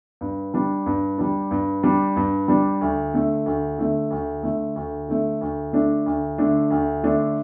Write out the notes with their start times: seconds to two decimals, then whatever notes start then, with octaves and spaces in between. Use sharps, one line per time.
0.21 G2
0.54 G3 D4
0.86 G2
1.18 G3 D4
1.51 G2
1.83 G3 D4
2.16 G2
2.48 G3 D4
2.81 D2
3.14 D3 A3
3.46 D2
3.78 D3 A3
4.11 D2
4.43 D3 A3
4.76 D2
5.09 D3 A3
5.41 D2
5.73 D3 A3 D4
6.06 D2
6.38 D3 A3 D4
6.70 D2
7.03 D3 A3 D4